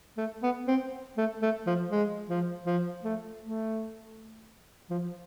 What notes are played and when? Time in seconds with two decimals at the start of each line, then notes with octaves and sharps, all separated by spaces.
0.18 A3
0.43 B3
0.68 C4
1.18 A3
1.42 A3
1.67 F3
1.92 G#3
2.30 F3
2.66 F3
3.04 A3
3.41 A3
4.90 F3